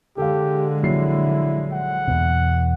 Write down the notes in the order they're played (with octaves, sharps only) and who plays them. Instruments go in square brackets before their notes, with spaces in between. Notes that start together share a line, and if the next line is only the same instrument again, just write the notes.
[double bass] D3 G#3 [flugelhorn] G4 [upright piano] A4 F5
[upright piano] A#1 F#3 C7 [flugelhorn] E4
[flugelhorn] F#5
[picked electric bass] E2 B2